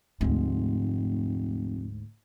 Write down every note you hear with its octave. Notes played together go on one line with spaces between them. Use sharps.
F1 D2 G#2